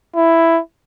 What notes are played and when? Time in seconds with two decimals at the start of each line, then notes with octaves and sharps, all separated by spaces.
0.16 E4